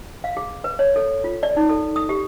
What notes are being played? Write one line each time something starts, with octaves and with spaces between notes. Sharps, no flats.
F5
G#4
B4
C#5
A4
F4
D5
D#4
A4
D#6
G4